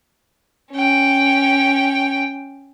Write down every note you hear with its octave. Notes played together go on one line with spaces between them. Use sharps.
C#4 G5